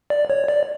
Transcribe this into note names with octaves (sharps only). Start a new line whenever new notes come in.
D5
C#5
D5